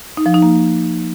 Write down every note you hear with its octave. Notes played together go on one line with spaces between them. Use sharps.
D#4
F3
D#4
A#3